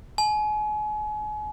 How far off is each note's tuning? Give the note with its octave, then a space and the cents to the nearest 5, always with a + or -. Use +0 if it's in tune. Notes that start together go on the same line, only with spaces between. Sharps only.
G#5 +35